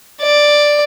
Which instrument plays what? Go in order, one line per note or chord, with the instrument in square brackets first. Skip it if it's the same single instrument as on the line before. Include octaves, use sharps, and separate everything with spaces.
[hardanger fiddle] D5